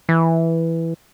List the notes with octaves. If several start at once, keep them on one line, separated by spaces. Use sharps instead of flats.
E3